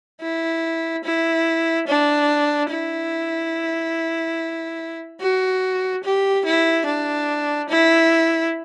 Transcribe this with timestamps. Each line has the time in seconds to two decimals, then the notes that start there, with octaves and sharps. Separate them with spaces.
0.21 E4
1.04 E4
1.88 D4
2.71 E4
5.21 F#4
6.04 G4
6.45 E4
6.87 D4
7.70 E4